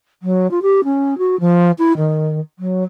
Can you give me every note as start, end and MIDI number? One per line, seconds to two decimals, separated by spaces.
0.22 0.49 54
0.51 0.59 65
0.62 0.81 67
0.84 1.17 61
1.18 1.38 66
1.40 1.71 53
1.78 1.93 64
1.97 2.40 51
2.59 2.83 54